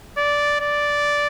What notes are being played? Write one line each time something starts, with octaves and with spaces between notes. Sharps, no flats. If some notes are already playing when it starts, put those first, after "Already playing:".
D5
D5